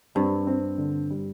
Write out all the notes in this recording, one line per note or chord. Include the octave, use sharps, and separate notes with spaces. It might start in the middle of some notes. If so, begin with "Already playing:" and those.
G2 C4
C4
D3
G3